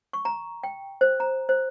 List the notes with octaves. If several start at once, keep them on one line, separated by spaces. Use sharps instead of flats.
C#6
A#5
G5
C5
A#5
C5